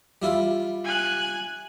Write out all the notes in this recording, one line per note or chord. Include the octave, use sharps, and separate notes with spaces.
G3 E4 F4
G#5 F#6